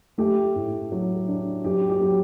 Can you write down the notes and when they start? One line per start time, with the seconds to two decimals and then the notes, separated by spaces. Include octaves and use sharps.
0.18 A3 G4
0.55 A2
0.92 F#3
1.28 D4
1.64 F#3 G4
1.89 G4
2.01 F#3